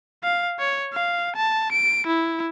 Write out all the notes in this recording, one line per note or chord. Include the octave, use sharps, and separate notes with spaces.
F5
C#5
F5
A5
D7
E4